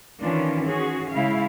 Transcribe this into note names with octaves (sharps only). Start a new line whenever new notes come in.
D#3 E3 C#4 D4 F4
C#4 F#4 G#4
C#3 G#3 E4 F5